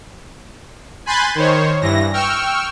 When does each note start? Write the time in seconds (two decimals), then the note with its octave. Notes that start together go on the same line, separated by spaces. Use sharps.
1.06 G#5 B5 C6 F#6 G6 A6
1.35 D#3 C5 C#5
1.81 G2 E3 A#6
2.13 G5 C#6 E6 F6